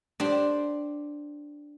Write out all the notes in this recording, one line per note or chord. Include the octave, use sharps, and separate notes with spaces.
D4 G4 C5